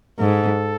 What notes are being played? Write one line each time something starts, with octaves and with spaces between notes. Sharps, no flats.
G#2 A4